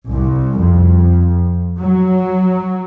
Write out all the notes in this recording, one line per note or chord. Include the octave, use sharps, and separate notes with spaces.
C2
F2
F#3